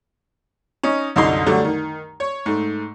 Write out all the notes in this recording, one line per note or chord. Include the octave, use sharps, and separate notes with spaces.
C#4 D#4
C2 F#2 D3 D#4 C6
D3 F#3 G3 A3
D#3
C#5
G#2 A3